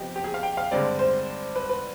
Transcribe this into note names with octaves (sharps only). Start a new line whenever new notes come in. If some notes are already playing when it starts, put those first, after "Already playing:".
Already playing: C3 F3 B3 G4 D#5
G4
G#4
F5
G5
F5
G2 D3 G#3 C4 D5
C5
B4
B4